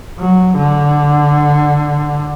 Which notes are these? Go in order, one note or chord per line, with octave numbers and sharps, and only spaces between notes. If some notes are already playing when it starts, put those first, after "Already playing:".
F#3
D3